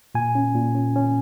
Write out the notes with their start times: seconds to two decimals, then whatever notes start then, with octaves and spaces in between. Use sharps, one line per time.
0.15 A#2 G#5
0.35 C#4
0.55 A#2
0.75 C#4
0.96 C#4